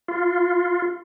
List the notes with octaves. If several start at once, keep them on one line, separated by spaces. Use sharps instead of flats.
F4